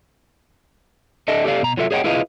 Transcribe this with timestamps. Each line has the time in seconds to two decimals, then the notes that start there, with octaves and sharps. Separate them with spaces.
1.28 D4 A4 D#5 E5
1.45 G4 A4 D5 F5
1.62 B2 A#5
1.77 F#3 F4 A4 E5
1.91 G#4 C#5 D#5 F#5 G5
2.04 E4 F4 G#4 B4 D#5 F5